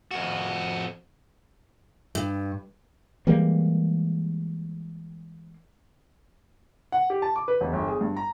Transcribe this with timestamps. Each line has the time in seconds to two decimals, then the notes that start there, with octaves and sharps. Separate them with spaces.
0.11 F2 F#4
2.15 G2
3.27 E3 G3 G#3 A#3
6.92 F#5
7.10 G4
7.22 A5
7.36 D6
7.48 B4
7.61 E1
7.73 G1
7.88 G#4
8.01 G2
8.17 A#5